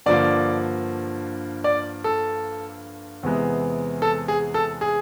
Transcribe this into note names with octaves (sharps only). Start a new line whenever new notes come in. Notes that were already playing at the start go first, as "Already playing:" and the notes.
G2 D3 F3 A#3 D5
D5
A4
E2 C3 E3 G#3 B3
A4
G#4
A4
G#4